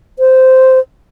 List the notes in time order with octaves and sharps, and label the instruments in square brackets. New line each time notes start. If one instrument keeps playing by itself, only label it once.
[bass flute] C5